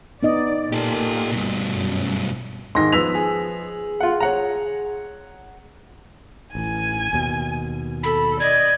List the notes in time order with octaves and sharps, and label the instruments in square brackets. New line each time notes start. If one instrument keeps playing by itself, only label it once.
[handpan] B3 D#4 D#5 [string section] D5
[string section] A#2 [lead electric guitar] G4 A4
[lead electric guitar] G2 B2
[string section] F#2
[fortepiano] G#2 D#3 [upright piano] C6 A#6
[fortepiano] F3 B3 [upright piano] E6 B6 F7
[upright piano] G#4
[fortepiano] F4 F#5
C#5 F#5 A#5
[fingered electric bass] A1 E3 [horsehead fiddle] G#5
[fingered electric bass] D#2 B2
[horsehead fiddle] A4 [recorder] B5
[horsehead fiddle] D5 D#5 [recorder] G#6